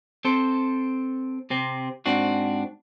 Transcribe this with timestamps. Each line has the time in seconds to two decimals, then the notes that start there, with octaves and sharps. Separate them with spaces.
0.25 C4 A4 C5
1.50 C3 C4
2.06 G#2 C4 D4 F#4